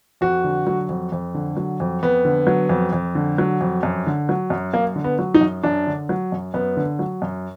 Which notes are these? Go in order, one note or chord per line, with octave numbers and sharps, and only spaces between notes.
F2 F#4
D3
F#3
F2
F2
D3
F#3
F2
F2 B3
D3
F#3
F2
F2
D3
F#3
F2
F#2
D3
F#3
F#2
F#2 A#3
D3
B3
F#3
D#4
F#2
F#2 D4
D3
F#3
F#2
F#2 B3
D3
F#3
F#2